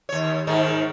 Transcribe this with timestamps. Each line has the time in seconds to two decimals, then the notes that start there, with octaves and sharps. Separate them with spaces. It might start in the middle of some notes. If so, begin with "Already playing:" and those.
0.09 D#2 C#5
0.47 G#2 D#3 D#4